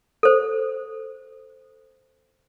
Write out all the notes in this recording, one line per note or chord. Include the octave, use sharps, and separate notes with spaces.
A4 C5